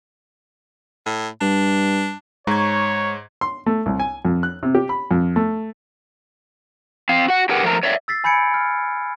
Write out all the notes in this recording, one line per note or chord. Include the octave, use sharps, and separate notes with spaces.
A2
G2 D4
G#2 G#3 C#5 A#5 C#6 G#6
C6
A3
C2
G#5
F2
F#6
C3
G4
B5
F2
A3
C4 F5
F#4 F#5
G4 G#4 A#4 B4 F#5 G5
F3 A3 A#4 A#5
C#5 D5 E5
E6 A6 B6 C7
G#5 B5 G6 G#6 C#7 D7
F6